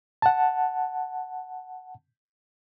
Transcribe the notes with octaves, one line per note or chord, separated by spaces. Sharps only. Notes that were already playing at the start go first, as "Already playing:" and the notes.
F#5 A5